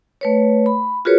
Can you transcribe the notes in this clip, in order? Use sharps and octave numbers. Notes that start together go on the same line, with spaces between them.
A3 B4 C#5
B5
F4 F#4 G#4 A#4 B4 C#5